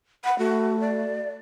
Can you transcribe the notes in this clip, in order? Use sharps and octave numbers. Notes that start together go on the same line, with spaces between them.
F#5 B5
A3 F#4
D5